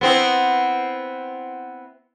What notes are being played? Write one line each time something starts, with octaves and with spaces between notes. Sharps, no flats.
B3 C4 E4